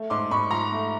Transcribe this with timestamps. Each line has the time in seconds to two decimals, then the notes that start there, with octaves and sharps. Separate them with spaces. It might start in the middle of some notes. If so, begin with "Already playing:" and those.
Already playing: A3
0.10 G#2 C6 D6
0.31 G#2 B5 C#6
0.50 F3 A#5 C6
0.72 A3